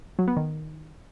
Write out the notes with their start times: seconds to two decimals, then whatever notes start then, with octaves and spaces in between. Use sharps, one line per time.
0.19 F#3
0.28 B3
0.37 D#3